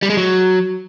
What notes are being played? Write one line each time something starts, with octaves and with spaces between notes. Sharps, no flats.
G3
G#3
F#3